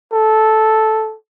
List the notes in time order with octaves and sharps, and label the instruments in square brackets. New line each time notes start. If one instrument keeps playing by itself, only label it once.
[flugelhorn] A4